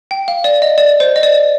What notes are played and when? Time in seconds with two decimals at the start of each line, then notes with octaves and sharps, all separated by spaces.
0.11 G5
0.28 F5
0.44 D5
0.62 D#5
0.78 D5
1.00 C5
1.16 D#5
1.23 D5